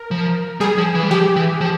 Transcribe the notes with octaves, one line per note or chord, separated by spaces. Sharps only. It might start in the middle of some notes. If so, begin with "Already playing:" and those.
Already playing: A#4
F3
G3 G#4
F3
E3
G3
F3 G4
E3
F3